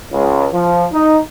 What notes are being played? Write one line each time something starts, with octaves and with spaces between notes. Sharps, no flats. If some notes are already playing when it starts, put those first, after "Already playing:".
C#2
F3
D#4